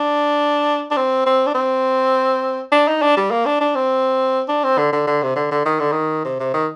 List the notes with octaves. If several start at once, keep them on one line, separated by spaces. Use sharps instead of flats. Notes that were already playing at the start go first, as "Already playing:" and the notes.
Already playing: D4
D4
C4
C4
D4
C4
D4
D#4
D4
G3
A#3
D4
D4
C4
D4
C4
D3
D3
D3
C3
D3
D3
D#3
D3
D#3
C3
C3
D#3